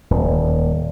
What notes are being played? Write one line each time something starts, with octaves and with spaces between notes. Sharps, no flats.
D#1